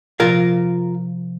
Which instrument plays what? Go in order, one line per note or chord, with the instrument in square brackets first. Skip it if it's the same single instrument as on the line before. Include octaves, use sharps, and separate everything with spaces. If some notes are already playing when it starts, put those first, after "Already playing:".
[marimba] C3 F3 A6 [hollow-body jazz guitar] F4 A#4 F5